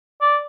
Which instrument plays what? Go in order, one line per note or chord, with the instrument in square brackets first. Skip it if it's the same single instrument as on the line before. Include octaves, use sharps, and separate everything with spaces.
[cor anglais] D5